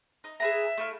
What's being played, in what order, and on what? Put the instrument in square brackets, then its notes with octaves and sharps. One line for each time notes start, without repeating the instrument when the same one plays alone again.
[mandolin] D#4
[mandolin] G#4 B4 A#5 [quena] E5
[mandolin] A3 E4 F5